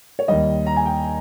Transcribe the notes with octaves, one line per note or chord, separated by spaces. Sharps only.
C#5
D#2 D#3 G3 D#5
A#5
G#5
G5